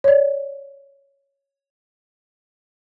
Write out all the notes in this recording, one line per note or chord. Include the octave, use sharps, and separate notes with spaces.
C#5 D5